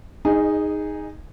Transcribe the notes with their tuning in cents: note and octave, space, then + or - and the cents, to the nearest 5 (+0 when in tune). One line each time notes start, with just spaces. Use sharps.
D#4 +0 G#4 -15 D#5 -35